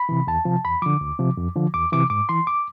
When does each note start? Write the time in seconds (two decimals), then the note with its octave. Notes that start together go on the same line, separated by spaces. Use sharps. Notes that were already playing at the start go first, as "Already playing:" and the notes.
Already playing: B5
0.09 C3 E3
0.27 E2 A5
0.45 C3 F3
0.64 E2 B5
0.82 D3 F3 D6
1.01 D2
1.19 C3 F3
1.37 F2
1.56 D3 F3
1.74 E2 D6
1.92 C3 E3 D6
2.10 G#2 D6
2.29 E3 C6
2.47 D6